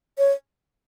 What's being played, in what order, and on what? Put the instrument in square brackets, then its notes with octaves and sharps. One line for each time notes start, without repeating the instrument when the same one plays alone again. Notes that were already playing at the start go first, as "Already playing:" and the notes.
[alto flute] C#5